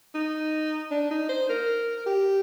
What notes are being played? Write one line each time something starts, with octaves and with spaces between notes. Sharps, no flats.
D#4
D4
D#4
C5
A#4
G4